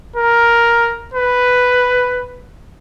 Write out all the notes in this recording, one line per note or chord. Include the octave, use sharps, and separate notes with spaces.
A#4
B4